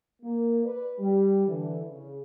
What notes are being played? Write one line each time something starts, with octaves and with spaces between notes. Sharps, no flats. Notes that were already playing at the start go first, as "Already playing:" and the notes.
A#3
B4 D5
G3
D3 E3
C#3